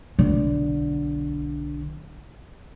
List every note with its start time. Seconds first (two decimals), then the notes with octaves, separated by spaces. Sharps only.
0.19 B1 D3